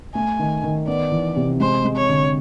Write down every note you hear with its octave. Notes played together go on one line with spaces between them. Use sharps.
A3 G#5
D#3
D#3
B3 D5
E3
C3
G#3 C5
G#3
C#5
D3